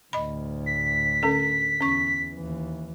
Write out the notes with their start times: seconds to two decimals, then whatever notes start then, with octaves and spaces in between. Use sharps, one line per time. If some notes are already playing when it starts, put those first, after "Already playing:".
0.13 D2 A2 D#5 B5
0.66 B6
1.23 D3 C#4 A4
1.81 E2 C#4 C#6
2.35 D#2 E3